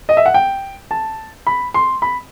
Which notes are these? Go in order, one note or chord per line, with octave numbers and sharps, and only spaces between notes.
D#5
E5
F#5
G5
A5
B5
C6
B5